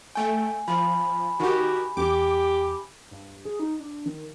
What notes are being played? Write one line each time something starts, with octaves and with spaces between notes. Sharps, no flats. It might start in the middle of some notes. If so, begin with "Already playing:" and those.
A3 G5 G#5
F3 B5
D#3 F#4 G4
E2 G4 D6
G2
G#4
D#4
D4
D#3